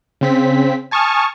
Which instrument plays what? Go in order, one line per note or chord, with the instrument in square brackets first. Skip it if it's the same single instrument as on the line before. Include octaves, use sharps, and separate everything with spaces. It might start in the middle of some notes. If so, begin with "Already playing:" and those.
[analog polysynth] C#3 C4 B6
G#5 A5 C#6 D#6 F6